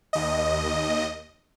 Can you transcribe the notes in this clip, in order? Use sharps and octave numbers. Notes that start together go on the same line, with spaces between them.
D#2 D#5